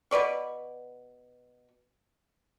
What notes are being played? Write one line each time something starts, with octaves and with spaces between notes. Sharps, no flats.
B2 B4 D5 C#6